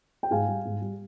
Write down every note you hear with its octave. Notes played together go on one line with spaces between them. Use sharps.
G5
G#2 F5 G#5
G3
G#2
G3